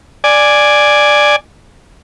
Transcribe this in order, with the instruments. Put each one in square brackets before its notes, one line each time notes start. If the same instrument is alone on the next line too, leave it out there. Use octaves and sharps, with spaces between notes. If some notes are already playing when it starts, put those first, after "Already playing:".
[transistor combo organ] D5 G#5